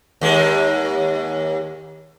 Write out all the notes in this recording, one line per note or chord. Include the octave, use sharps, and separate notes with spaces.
D#2 G#3